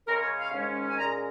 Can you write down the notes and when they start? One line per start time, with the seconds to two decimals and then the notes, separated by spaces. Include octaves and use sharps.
0.07 C#3 G#3 C#4 A#4
0.22 C#5
0.37 F5
0.52 G#2 D#3 G#3 C#4
0.89 G#5
0.97 A#2 G#3 C#4 A#5